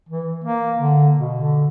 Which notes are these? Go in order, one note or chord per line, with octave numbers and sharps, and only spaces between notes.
E3
A#3
D3
B2
D3